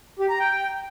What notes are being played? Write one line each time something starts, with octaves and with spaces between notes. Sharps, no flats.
G4
A#5
G5